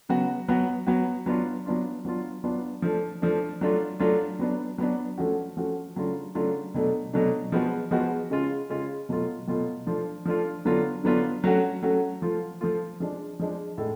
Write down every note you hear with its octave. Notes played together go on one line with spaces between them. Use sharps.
C#3 F#3 B3 F#4
F#3 B3 F#4
F#3 B3 F#4
F#3 B3 D4 F4
F#3 B3 D4 F4
F#3 B3 D4 F4
F#3 B3 D4 F4
F3 A3 D4
F3 A3 D4
F#3 A3 D4 F4
F#3 A3 D4 F4
F#3 B3 D4
F#3 B3 D4
F3 A3 C#4 F#4
F3 A3 C#4 F#4
C#3 F#3 A3 D4 F4
C#3 F#3 A3 D4 F4
B2 F#3 A3 D4
B2 F#3 A3 D4
F3 G#3 B3 F#4
F3 G#3 B3 F#4
C#3 G#3 C#4 F4
C#3 G#3 C#4 F4
B2 F#3 A3 F4
B2 F#3 A3 F4
F3 A3 D4 F4
F3 A3 D4 F4
D3 F#3 B3 D4 F4
D3 F#3 B3 D4 F4
F#3 A3 C#4 F#4
F#3 A3 C#4 F#4
F3 A3 F4
F3 A3 F4
F3 G#3 D4
F3 G#3 D4
A2 G#3